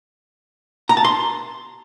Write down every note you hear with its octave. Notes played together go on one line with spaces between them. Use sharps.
A#5
A5
C6